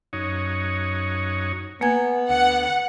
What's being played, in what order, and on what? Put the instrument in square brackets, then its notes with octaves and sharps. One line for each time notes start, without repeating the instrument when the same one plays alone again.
[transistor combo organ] F#2 D#4 C#5
[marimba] A#3 G#5 G#6 [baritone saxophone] B3
[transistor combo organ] D2 [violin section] F#5